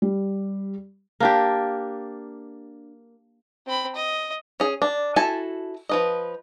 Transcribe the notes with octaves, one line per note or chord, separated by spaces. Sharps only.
G3
A#3 D4 G4
C4 B5
D#5
C#4 G#4
D4
E4 F#4 A4 G#5 A5
F3 B4 D#5